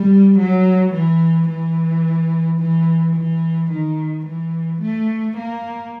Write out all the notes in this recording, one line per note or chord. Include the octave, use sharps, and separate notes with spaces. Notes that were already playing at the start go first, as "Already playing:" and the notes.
Already playing: G3
F#3
E3
E3
E3
E3
D#3
E3
A3
A#3